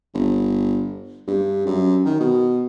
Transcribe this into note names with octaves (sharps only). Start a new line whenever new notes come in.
G1
G2
F#2
D#3
B2